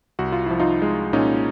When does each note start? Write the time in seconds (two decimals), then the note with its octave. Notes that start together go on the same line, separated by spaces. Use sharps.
0.19 C2 F#4
0.32 F4
0.46 F3 E4
0.60 D#4 F4
0.82 G#3
1.13 A#2 C#4 D#4